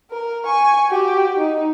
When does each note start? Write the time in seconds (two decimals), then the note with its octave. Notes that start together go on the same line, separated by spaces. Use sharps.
0.11 A#4
0.45 G#5 C#6
0.89 F#4 G4
1.37 D#4